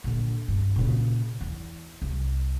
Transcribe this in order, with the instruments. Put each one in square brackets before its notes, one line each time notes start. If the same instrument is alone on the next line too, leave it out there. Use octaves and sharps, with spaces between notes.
[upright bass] A#2 D3
G2
A#2 C#3
E2
C2